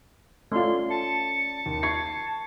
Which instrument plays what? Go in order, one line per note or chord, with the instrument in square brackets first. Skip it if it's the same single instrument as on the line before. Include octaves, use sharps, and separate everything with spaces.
[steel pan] A3 F4 [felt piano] C#4 D5 [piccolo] C6
[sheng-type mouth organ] A5 [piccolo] C#7
[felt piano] D#2
C#6 G#6 C7